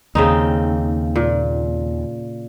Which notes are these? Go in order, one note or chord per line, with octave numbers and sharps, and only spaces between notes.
D#2 C#3 C4 D#4
A#2